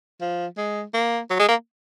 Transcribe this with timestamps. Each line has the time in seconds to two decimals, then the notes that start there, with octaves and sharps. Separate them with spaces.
0.21 F3
0.58 G#3
0.94 A#3
1.30 F#3
1.39 G#3
1.49 A#3